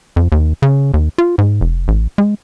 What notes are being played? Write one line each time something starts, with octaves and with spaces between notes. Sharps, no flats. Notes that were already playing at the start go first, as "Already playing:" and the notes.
F2
D#2
C#3
D#2
F4
G#2
F1
A1
G#3